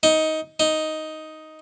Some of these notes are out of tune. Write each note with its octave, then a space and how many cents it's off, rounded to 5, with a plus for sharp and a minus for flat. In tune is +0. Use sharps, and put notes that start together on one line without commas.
D#4 +15
D#4 +5